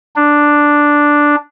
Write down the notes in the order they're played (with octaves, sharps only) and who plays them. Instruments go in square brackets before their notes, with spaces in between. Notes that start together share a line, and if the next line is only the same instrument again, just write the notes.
[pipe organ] D4